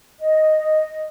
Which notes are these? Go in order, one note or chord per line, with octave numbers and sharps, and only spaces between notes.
D#5